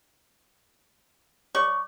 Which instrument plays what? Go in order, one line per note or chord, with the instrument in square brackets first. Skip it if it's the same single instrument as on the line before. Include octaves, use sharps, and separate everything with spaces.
[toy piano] C#5 D5 D6 [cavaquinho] C#6